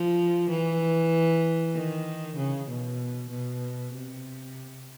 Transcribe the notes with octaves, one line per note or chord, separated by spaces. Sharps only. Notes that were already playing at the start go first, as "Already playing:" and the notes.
Already playing: F3
E3
D#3
C#3
B2
B2
C3